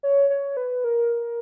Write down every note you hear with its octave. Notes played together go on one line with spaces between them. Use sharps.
C#5
C#5
B4
A#4